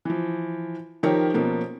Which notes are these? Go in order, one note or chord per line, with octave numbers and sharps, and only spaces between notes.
E3 F3
D#3 F3 G4 A#4 C#5
B2 F3 A#3 C#4